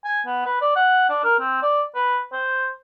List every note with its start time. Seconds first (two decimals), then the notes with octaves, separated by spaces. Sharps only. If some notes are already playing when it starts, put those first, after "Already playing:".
0.05 G#5
0.26 B3
0.46 B4
0.61 D5
0.76 F#5
1.09 D4
1.24 A#4
1.40 C4
1.63 D5
1.95 B4
2.32 C5